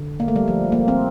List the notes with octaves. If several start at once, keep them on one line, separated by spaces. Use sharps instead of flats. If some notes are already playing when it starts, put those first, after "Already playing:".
Already playing: D3
A#3
A3
G3
F3
A#3
C4